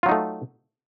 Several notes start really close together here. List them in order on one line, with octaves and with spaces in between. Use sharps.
F4 F#3 D#4 A3